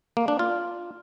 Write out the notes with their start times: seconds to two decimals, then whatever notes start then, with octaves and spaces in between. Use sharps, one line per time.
0.17 A#3
0.28 D4
0.39 F4